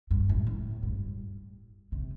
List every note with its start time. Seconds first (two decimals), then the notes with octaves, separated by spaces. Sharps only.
0.11 G2
0.29 A2
0.47 A2
0.83 G2
1.92 C3